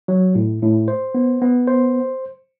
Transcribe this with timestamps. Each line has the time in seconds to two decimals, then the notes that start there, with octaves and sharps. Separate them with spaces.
0.08 F#3
0.35 A2
0.62 A2
0.88 C5
1.14 B3
1.42 B3
1.67 C5